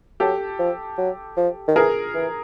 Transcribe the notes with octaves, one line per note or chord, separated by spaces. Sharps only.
F#3 G4 A4
F3
F#3
F3
D#3
E3 G#4 A#4
E3